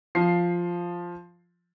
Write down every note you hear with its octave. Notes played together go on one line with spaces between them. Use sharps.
F3 C7